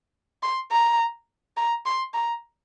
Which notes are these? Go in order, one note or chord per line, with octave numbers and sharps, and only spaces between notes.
C6
A#5
A#5
C6
A#5